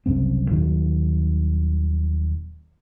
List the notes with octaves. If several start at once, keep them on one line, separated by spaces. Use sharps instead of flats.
F#1 C2 F#2 C4
D#1 A#2 D#3 F#3